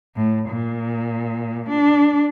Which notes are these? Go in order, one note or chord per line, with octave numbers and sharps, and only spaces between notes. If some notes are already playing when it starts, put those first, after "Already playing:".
A2
A#2
D4